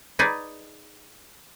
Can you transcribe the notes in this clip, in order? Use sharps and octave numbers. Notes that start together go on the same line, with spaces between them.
D#4 G#4 B4 D5